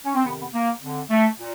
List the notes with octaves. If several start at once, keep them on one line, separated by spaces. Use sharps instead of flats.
C#4
C4
F2 C3 D#3 B3
B3
A#3
F2 D3
A3
A#2